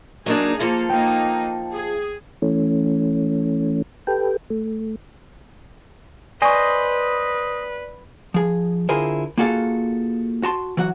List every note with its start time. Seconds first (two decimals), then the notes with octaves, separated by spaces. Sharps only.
0.26 F#3 A#3 D4 D#4 G#4
0.59 F3 A#3 A4 F5 A#6 C#7
0.89 A#3 D#4 G5
1.72 G#4
2.42 E3 A3 C#4
4.07 G4 A4 B4 G5
4.50 A3
6.42 B4 C5 D5 D#5 G#5 C#6
8.34 F3 G#4
8.89 D3 E4 F4 G#4 A#4 C5
9.38 A#3 F4 F#4 G#4 A4 F5
10.43 F#4 A5 C6
10.77 E3 F#3 F#4 F#5